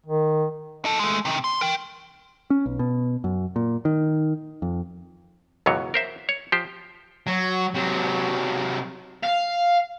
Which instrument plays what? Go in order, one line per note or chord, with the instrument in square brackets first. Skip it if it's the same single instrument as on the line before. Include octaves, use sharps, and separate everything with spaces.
[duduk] D#3
[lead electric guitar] D#4 A4
G#3 A3
C3 D#3
C6
A#4 G5
[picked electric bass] C#4
B1
B2
F#2
A#2
D#3
F2
[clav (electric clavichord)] C#2 F#2 B2 E3 F#3 C#5
A#4 C5 E5
C#5
F3 G4 C5
[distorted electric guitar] F#3
C3 F#3
F5